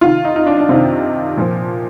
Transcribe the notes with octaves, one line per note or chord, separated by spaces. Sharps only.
C3 D#3 F4
D#4
D#4
D4
D4
C3 D#3 C4
A#2 F3